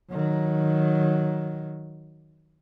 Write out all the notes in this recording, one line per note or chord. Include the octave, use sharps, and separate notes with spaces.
D#3 F#3